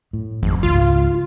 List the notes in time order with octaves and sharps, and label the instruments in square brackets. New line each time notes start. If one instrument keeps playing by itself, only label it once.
[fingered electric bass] A2
[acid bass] G#1 [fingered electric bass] F2
[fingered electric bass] C#2 G#2 [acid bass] F4